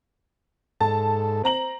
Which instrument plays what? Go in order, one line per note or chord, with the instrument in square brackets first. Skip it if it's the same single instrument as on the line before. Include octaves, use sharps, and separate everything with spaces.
[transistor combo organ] G#2 A4 [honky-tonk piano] A5
[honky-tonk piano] C4 A#5 F#7